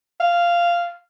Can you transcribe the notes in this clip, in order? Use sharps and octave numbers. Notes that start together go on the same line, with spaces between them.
F5